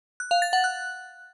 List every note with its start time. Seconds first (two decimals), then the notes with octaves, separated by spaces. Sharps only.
0.20 F#6
0.31 F5
0.42 A6
0.53 F#5
0.64 F#6